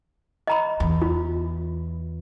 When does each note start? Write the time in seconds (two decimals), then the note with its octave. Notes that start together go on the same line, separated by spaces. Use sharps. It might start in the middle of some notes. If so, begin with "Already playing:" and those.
0.47 D#5 A#5 B5
0.80 E2
1.02 F4